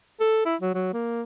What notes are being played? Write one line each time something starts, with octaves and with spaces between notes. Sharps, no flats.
A4
E4
F#3
F#3
A#3